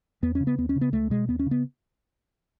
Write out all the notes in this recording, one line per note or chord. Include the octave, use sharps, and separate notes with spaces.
E2 B3
C#3 C#4
B3
D#2 B3
C#4
C#3
B3
C#2 A3
B2 G#3
D#2 B3
C#4
C#3
B3